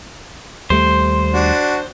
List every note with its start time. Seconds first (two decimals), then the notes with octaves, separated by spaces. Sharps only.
0.70 D#2 G3 A3 C5
1.34 D4 F#4